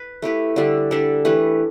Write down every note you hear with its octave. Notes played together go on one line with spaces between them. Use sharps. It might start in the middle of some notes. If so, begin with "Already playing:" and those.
Already playing: B4
A3 E4 G4 B4
D3 G3 D4 A4
D3 G3 D4 A4
E3 A3 G4 B4